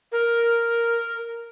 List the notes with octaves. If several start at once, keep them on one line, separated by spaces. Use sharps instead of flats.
A#4